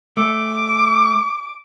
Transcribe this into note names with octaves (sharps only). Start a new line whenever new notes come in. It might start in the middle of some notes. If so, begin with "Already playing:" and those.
A3 D6